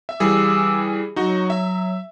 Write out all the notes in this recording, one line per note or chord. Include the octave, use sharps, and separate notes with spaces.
E5
E3 G3 G#4 F5 D6 E6
F#3 D#4 F#4
E5